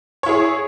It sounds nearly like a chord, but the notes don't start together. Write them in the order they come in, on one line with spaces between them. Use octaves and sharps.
C#5 E4 G#4